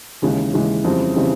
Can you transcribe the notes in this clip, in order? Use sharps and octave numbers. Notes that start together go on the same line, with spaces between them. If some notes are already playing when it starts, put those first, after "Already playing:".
D#2 C#3 E3 G#3
D#2 C#3 E3 G#3
F2 C#3 E3 G3 C4
C#3 E3 G3 C4